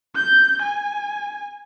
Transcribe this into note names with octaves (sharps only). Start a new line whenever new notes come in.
G6
G#5